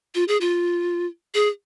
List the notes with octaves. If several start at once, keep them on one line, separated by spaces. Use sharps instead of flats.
F4
G#4
F4
G#4